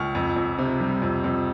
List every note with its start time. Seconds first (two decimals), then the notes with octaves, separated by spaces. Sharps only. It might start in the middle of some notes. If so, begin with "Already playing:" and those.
Already playing: C#2 C#6 F6
0.15 F2
0.36 F2
0.58 C3
0.80 G3
1.02 F2
1.24 F2